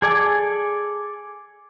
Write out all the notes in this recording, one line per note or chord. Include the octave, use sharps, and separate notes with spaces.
G#4 A4 D5 G#5